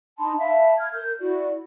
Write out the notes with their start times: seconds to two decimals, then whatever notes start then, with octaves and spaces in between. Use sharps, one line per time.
0.18 D#4 A5 B5 C6
0.39 E5 F5 A5 B5
0.78 F6 G#6
0.94 A#4 G6
1.20 E4 F#4 D5